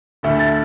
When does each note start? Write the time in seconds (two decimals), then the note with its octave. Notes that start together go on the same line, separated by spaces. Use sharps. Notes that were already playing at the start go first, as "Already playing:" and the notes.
0.23 D2 D3 A3 E4
0.39 A6